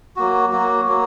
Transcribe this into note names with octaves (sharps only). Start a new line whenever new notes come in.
F#3 A#3 F#4
F#3 A#3 F#4
F#3 A#3